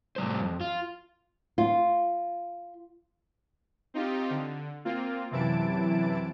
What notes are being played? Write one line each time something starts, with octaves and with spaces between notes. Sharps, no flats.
A2 G3 C5
F2
F4
F4
C4 D#4 F4 G4
D3
A#3 C4 F4
F#2 C3 E3 E4 A5 D7